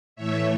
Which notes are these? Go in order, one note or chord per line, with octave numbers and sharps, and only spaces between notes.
A2 E3 A3 C#5 E5